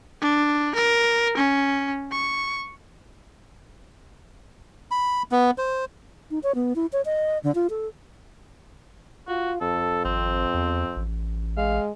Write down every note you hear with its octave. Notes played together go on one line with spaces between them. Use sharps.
D4
A#4
C#4
C#6
B5
B3
C5
D#4
C#5
B3
E4
C#5
D#5
D3
F4
A4
F4 F#4
F2 A4
G#1 C4
E2
A1
G#3 F5